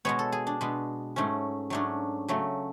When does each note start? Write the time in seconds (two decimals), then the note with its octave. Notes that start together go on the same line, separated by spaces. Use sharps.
0.05 B2 G#3 B3 C#5
0.19 A4
0.32 G#4
0.47 D4
0.61 B2 G#3 B3
1.16 G#2 F#3 A3 C#4
1.70 G#2 F#3 A3 C#4 D4
2.28 C#3 F#3 A3